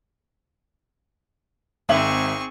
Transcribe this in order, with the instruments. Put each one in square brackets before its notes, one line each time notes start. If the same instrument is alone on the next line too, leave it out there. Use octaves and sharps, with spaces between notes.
[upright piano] G#1 E5 F#7 [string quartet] C4 G#4 C#6